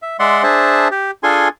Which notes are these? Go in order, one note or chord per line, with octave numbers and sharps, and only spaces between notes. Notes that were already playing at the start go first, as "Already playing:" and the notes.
E5
G#3 D5 E5 F#5 C6
D4 G#4 C5 E5 A5
G4
D4 F4 G#4 A4 G#5 C6